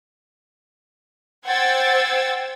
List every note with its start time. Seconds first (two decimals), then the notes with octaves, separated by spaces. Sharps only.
1.45 C5 F#5 G5 E6 G#6 A6